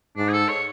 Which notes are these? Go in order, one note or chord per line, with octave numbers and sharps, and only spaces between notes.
G#2 D4
G#4
A4
C#5